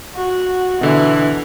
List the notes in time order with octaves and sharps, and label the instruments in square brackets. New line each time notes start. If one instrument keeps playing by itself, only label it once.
[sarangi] F#4
[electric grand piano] B2 D3 [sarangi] E3